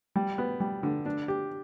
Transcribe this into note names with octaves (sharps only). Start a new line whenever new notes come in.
G3
B3
G3
D3
D4
G4